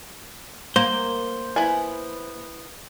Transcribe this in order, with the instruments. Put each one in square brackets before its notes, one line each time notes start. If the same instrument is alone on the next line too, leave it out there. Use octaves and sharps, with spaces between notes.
[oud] A#3 [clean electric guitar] C5
[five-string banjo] B3 E4 G#5